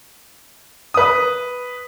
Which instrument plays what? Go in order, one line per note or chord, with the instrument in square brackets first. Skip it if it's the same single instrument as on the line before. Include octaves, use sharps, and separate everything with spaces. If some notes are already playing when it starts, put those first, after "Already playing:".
[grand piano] B4 D#6